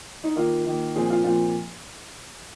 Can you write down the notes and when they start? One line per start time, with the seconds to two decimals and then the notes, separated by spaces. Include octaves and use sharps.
0.24 D#4
0.36 D#3 A#3 F4
0.66 D#3 A#3
0.96 A#2 F3 C4 G#4
1.10 F4
1.24 A#2 F3 C4 F4